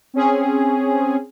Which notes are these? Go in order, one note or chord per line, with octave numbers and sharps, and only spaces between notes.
C4 C#4 G#4